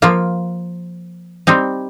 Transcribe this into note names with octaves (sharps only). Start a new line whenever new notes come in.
F3 A#3 F4
G3 C4 D#4